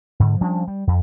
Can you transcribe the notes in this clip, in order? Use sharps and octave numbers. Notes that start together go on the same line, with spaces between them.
G#2 D3
F3 G3 C#4 D4
G3
F2